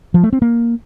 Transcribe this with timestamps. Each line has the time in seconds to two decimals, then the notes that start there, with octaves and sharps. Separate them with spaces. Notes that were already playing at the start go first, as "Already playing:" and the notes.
0.14 F3
0.23 A3
0.33 C4
0.42 A#3